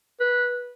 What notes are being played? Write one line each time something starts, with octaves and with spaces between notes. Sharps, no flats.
B4